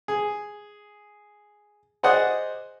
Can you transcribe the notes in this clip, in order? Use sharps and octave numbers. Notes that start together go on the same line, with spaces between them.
G#4
G#4 C5 D5 D#5 F#5